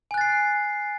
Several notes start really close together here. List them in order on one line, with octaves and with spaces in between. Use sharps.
G#5 F#6 A6 C7